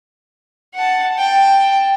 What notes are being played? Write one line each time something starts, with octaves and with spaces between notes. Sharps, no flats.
F#5 A5
G5 A5